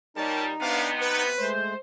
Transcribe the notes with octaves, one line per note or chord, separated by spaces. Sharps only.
A#2 G3 D#4 A#4 C#5 A5
C3 B3 D4 F5
B4
G#3 A3 C5